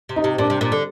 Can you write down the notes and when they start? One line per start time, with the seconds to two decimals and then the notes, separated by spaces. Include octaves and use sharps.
0.09 C3
0.16 D#4
0.24 C3
0.38 A#2 D4
0.50 C3
0.61 A#2
0.72 D3